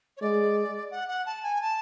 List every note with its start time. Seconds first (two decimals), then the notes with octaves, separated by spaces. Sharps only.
0.17 C#5
0.21 G#3 D5
0.91 F#5
1.08 F#5
1.26 A5
1.43 G#5
1.62 A5